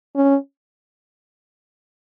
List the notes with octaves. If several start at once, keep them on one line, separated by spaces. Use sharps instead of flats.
C#4